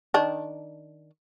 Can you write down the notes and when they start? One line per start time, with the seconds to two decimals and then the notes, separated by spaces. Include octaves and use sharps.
0.14 D#3 D4